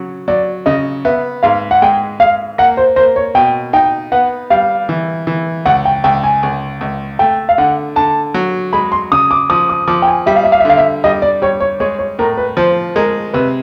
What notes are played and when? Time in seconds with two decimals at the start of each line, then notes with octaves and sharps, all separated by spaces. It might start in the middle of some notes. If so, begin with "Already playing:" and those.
Already playing: C#3 F#3
0.28 F#3 D5
0.66 C#3 D#5
1.05 B3 E5
1.43 G#2 F5
1.71 F#5
1.82 G#3 G5
2.20 G#3 F5
2.58 A#3 F#5
2.77 C5
2.96 A#3 C5
3.16 C#5
3.35 B2 G5
3.73 D#4 G5
4.12 B3 F#5
4.50 G3 F5
4.89 E3
5.27 E3
5.65 C#2 F#5
5.85 G5
6.04 C#2 G5
6.23 G#5
6.43 C#2
6.81 C#2
7.19 A3 G5
7.49 F5
7.58 D3 F#5
7.96 D3 A5
8.34 F#3
8.73 G#3 B5
8.92 C6
9.12 C#3 D#6
9.31 D6
9.50 F3 D#6
9.69 D#6
9.88 F3 D6
10.02 G5
10.08 G#5
10.26 G3 E5
10.36 F5
10.44 E5
10.52 F5
10.61 E5
10.65 D3 F5
10.78 E5
11.04 G3 D#5
11.22 D5
11.42 G3 C#5
11.60 C#5
11.80 G#3 C#5
11.99 C#5
12.19 A2 A#4
12.37 B4
12.57 F3 C5
12.96 G#3 A#4
13.33 C3 B4